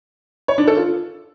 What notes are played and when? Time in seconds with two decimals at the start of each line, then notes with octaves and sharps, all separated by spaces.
0.48 C#5
0.58 D4
0.67 A4
0.77 F4